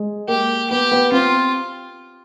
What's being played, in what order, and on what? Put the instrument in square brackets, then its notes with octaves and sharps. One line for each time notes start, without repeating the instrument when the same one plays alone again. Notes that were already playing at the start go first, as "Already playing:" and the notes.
Already playing: [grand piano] G#3
[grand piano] A#3 [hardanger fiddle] G4
[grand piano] B3 [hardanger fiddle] G4
[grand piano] B3
[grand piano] C4 [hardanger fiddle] F4